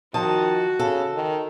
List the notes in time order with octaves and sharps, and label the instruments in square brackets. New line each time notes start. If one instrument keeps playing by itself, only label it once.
[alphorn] D#3 [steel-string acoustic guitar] F3 D#5 A5 [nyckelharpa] F#4
[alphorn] C#3 [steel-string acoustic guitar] A4
[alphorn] D#3